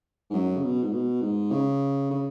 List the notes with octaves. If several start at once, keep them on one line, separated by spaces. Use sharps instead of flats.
G#2
F#2
C#3
B2
G#2
B2
G#2
C#3
C#3